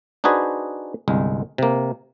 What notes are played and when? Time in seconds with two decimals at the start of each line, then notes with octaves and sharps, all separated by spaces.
0.24 D4 D#4 F#4 G#4 B4 C5
1.08 G1 C2 G#3
1.58 C3 A#3